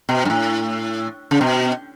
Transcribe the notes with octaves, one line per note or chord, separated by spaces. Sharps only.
B2
G2
A2
C#3
B2